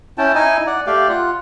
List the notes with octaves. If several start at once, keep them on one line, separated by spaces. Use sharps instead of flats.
C#4 E4 G5 A5
D#4 E4 D#5 G#5
D5 F#5
A3 G4 D5 F5
F4 F#5